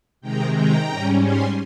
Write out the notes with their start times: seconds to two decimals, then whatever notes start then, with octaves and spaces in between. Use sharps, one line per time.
0.21 C3 D#3 G#3 G5 A#5
0.54 G5 A#5
0.88 G#2 G3 C#4
1.21 G#5 C6